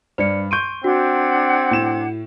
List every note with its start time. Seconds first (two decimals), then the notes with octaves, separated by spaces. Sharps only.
0.18 G2 C5 D5 C#7
0.51 C6 C#6 G6 D7 D#7
0.84 C4 D4 F#4 F#5 G#6
1.71 A2 E7